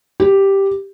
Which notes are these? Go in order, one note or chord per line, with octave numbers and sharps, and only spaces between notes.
G4